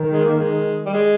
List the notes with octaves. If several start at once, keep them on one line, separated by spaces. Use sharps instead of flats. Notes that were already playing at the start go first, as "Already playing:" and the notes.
Already playing: D#3
G#3
A#3
G#3
G3
G#3